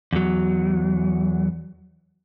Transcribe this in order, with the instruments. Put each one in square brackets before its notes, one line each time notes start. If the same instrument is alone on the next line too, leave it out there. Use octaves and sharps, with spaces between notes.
[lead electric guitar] E2 F#3